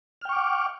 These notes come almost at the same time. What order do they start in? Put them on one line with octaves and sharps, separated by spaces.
F6 G5 C#6 D6 F#5